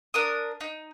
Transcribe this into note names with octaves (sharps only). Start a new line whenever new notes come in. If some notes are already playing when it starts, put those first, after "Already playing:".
D4 A#4 D#6
D#4